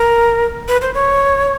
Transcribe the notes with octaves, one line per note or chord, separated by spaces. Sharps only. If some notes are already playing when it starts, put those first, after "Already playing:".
Already playing: A#4
B4
C5
C#5